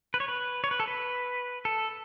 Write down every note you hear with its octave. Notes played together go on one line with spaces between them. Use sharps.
B4
C#5
B4
C#5
B4
A4
B4
A4